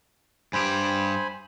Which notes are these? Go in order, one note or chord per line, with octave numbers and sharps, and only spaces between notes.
G2 G4 C5 G#5 B5